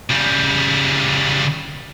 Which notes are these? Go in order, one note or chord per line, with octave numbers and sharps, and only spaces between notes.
C#3 G3